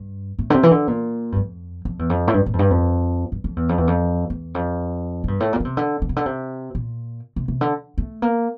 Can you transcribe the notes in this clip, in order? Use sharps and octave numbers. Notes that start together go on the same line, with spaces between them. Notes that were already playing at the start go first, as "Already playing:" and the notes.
Already playing: G2
A2
D3
C3
E3
D3
A#2
G2
F2
F2
E2
F2
A2
G2
A2
F2
G2
F2
G2
F2
E2
F2
E2
F2
E2
F2
A2
G2
A2
A#2
D3
C3
D3
D3
C3
D3
C3
A#2
C3
C3
D3
A3
A#3